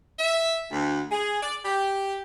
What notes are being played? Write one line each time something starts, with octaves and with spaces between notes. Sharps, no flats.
E5
D2
G#4
D5
G4